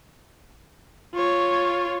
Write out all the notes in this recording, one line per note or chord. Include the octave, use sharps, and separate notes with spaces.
F4 C#5